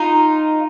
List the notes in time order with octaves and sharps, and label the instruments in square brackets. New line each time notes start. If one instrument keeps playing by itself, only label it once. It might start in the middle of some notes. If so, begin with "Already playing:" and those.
Already playing: [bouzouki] D#4 F4